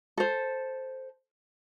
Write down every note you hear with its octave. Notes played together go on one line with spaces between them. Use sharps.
A4 C5